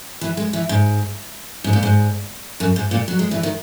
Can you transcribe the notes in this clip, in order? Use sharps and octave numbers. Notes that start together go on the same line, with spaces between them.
E3
G#3
E3
G#2
G#2
A#2
G#2
F#2
G#2
A#2
F#3
G#3
E3
D#3